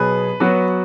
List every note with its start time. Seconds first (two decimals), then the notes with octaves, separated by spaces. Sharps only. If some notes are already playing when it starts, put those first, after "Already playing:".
Already playing: B2 F#3 B3 G#4 B4
0.40 F#3 B3 F#4